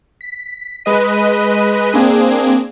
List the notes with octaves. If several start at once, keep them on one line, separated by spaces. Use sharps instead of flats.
B6
G#3 B4 D#5 D#7
A#3 C4 D4 G#4